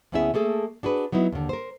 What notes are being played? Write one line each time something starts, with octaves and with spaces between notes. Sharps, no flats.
D2 B3 C#4 E4 G#4 E5
A3 A#3 G#4 A4
D4 F#4 G#4 B4
F#3 B3 D#4 E4
D#2 D3
A#4 C5